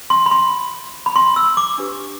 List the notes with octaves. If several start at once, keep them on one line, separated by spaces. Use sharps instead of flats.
C6
B5
C6
B5
C6
E6
D6
D4 G4 B4